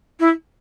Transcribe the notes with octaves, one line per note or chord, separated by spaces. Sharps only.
E4